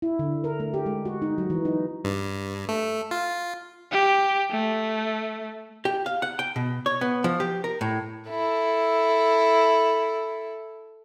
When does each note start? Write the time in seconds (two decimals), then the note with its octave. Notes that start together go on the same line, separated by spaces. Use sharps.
0.02 E4
0.19 D3
0.44 A#4
0.60 A3
0.74 G4
0.86 G#3
1.05 F#4
1.22 D#4
1.38 F#3
1.50 E3
1.65 D#4
2.04 G2
2.69 A3
3.11 F4
3.92 G4
4.51 A3
5.85 G4
6.06 F5
6.22 F#5
6.39 G5
6.56 B2
6.86 C#5
7.01 B3
7.24 F3
7.40 G4
7.64 A#4
7.81 A2
8.28 E4 A4